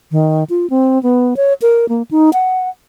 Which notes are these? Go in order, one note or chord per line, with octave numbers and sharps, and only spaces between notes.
D#3
F4
C4
B3
C#5
A#4
A#3
D#4
F#5